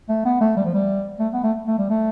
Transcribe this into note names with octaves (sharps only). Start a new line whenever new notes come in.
A3
B3
A3
G3
F3
G3
A3
B3
A3
A3
G3
A3